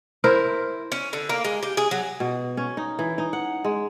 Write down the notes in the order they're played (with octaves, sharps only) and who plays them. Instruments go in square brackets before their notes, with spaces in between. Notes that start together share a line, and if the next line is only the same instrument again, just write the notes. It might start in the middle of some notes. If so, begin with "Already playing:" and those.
[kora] E4 A#4 C5
[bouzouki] C#4
D3
A#3
G#3
G4
G#4
F#3
[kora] B2
C#4
D#4
E3
D#4
F#5
G#3